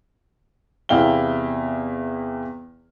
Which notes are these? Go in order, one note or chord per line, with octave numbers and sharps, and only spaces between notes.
E2 C3 E4 F5 G5 G7